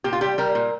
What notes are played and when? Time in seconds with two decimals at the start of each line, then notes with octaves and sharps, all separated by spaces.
0.04 A#2 G4
0.13 F4
0.21 G3 G4
0.38 G3 A#4
0.55 A#2